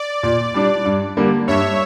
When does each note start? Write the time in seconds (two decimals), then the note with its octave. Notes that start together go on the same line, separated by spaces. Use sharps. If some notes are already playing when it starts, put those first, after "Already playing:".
Already playing: D5
0.23 A#2 D5
0.54 G3 D4
0.85 G2
1.17 D3 G3 A#3
1.47 G2 C#5 E5